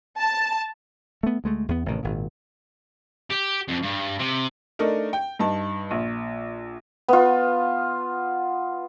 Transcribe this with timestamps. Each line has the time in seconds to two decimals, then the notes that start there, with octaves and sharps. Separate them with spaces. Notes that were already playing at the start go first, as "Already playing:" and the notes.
0.19 A5
1.23 A3 B3
1.44 D2 G#3 A3
1.68 E2 B3
1.86 A1 A2 C3 D#3
2.03 G#1 A#2
3.30 G4
3.68 F2
3.83 G2
4.19 C3
4.79 A3 D4 D#4 A#4
5.13 G5
5.39 G2 D#4 A5
5.91 A#1
7.08 B3 F4